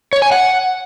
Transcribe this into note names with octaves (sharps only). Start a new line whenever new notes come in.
C#5
G#5
F#5